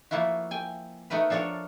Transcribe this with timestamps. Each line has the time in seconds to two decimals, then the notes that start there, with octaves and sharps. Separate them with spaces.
0.11 F3 A3 A#3 E4 F#4
0.51 G5 G#5
1.10 A3 D#4 F#4 A#4 B4
1.30 F3 D4 A4 A#4 C#5